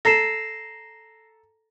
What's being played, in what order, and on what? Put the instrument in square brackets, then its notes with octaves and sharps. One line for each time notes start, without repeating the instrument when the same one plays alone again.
[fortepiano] A4 A#5 [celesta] A#6 C7 E7